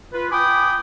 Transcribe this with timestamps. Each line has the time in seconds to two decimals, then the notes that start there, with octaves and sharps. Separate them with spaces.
0.12 F4 B4
0.31 G5 G#5 B5 D6 D#6